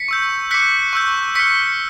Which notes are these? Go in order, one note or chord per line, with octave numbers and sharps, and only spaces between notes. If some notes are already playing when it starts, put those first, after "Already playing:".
Already playing: B6 C#7
C#6 E6 G6
D6 F#6 B6 C#7
C#6 E6 G6
C#6 F6 B6 C#7